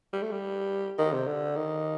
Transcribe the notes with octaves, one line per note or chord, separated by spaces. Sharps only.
G3
A3
G3
D#3
C3
D3
D#3